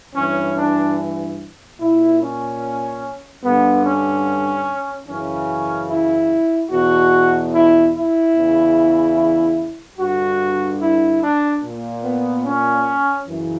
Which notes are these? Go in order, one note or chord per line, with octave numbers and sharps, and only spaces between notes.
G2 E3 C#4
D4
A#2 E4
C#4
G2 D3 B3
C#4
F#2 C#3 E3 C#4
E4
E2 B2 F#4
E4
E4
E2 C#3 E3
G2 D3 F#4
E4
D4
A#2
B3
C#4
F#2 C#3 E3